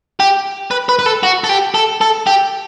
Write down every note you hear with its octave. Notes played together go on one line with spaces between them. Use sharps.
G4
B4
B4
B4
A4
F#4
A4
G4
A4
A4
G4